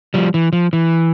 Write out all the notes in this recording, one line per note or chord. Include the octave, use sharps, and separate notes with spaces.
F3 G3
E3
F3
E3